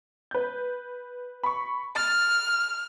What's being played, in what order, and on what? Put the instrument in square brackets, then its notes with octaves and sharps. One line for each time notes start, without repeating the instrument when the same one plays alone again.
[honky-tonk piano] B4 G6
B5 C#6
[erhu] F6 [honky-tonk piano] A6